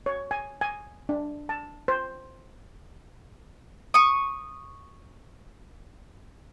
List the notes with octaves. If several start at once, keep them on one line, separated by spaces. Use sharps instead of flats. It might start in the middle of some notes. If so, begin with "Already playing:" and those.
C#5
G#5
G#5
D4
A5
C5
C#6 D#6